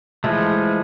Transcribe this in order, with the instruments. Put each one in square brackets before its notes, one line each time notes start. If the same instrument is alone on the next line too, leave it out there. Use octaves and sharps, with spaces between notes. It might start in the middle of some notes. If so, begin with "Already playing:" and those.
[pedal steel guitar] E3 F3 G#3 A3